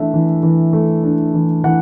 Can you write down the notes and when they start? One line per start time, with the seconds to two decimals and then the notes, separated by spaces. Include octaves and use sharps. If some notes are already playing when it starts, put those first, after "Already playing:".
Already playing: E3 A3 D4 E5
0.14 E3
0.43 E3
0.73 A3
1.04 D4
1.34 E3
1.64 E3 F#5